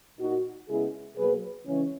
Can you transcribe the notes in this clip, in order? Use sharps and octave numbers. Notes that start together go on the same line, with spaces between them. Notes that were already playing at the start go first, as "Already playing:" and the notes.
A#2 A#3 D#4 F#4
C#3 G#3 B3 E4 G#4
B2 F#3 A#3 G#4 B4
C#3 E3 G#3 C#4